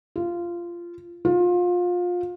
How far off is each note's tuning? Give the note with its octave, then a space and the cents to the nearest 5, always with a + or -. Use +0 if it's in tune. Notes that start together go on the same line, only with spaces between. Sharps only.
F4 -15
F4 +25